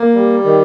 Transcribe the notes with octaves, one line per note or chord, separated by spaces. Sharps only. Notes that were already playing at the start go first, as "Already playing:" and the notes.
Already playing: A#3
G3
D#3